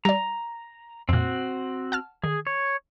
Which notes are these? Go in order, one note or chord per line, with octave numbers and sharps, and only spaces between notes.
G3 D5 A#5
F2 A#2 C4 F#4
F#5 A5 F6
D#3 G#4
C#5